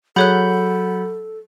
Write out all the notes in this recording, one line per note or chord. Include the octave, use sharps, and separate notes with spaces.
F#3 G#4 A4 C#5 F#5 B5 F#6 G6